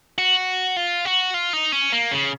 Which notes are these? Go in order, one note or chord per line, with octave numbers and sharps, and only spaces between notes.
F#4
F4
F#4
F4
D#4
C#4
A#3
C#3